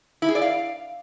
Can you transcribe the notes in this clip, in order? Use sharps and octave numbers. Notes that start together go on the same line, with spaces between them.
E4
G#4
D5
F5